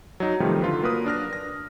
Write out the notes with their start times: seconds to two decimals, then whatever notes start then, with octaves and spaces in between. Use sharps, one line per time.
0.20 F#3 D#4
0.40 C3 D#3 F3 G3 A3
0.62 D3 F4 B4
0.82 F#3 A#3 A#4 B4 D#6
1.06 D4 F6 A#6
1.33 A#6